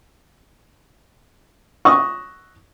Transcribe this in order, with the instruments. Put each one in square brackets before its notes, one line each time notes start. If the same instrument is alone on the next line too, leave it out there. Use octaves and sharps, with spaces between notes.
[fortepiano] D#5 F#5 C#6 E6